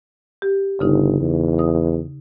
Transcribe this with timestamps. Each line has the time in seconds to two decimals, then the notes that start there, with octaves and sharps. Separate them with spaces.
0.42 G4
0.80 G1 C#3 D#4
1.20 E2
1.59 D#6